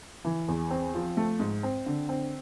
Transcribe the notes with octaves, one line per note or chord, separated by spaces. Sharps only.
E3
E2
C4
F3
A3
G#2
C4
D3
C4